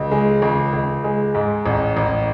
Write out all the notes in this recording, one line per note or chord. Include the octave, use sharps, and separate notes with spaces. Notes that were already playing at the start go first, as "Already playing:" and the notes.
Already playing: C#2
G#3
C#2
C#2
G#3
G#2
A1
A1